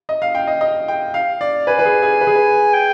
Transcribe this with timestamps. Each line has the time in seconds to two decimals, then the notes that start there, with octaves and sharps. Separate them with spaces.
0.09 D#5
0.22 F5
0.35 G5
0.47 D#5
0.61 D#5
0.88 G5
1.14 F5
1.41 D5
1.67 B4 G#5
1.79 B4
1.85 G#4
2.02 G#4
2.21 B4
2.27 G#4
2.35 B4
2.73 G5